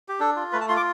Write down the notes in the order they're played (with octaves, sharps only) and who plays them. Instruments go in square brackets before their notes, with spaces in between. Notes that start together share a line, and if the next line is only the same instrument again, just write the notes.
[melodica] G4
D4 A4
F4
A3 B4
A5
F4 C6
D6